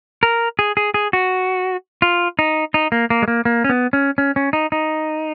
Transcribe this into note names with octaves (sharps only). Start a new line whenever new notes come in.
A#4
G#4
G#4
G#4
F#4
F4
D#4
D#4
A#3
A#3
G#3
A#3
A#3
C#4
B3
C#4
C#4
C#4
D#4
D#4